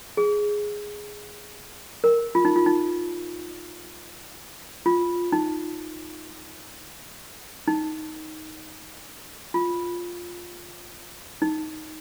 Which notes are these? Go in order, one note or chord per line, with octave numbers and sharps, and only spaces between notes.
G#4
A#4
F4
D#4
F4
D#4
F4
D#4
D#4
F4
D#4